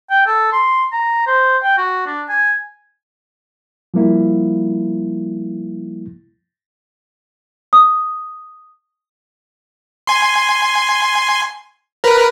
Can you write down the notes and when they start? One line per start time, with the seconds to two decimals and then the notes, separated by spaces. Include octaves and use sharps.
0.10 G5
0.27 A4
0.52 C6
0.93 A#5
1.27 C5
1.63 G5
1.78 F#4
2.06 D4
2.29 G#5
3.94 F3 G3 A#3 E4
7.73 D#6
10.07 G#5 C6
12.04 A#4 B4